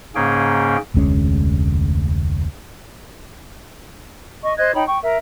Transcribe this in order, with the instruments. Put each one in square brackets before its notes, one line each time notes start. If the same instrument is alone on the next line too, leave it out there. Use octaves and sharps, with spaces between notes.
[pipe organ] G#2 C#3 A#3 C#4 G#4 G5
[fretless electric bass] F1 D2 G#3 C#4
[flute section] D#5 C#6
C5 D#5 F#6 G#6
D#4 C#5 G5 B5
G5 C#6
A#4 E5